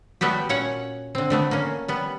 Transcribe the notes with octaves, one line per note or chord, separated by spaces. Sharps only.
G3 A3 B3 F#4 G4
A#2 C#4 C#5 F#5
D3 C4
D3 A3 B3
A#3 C#4
G3 B3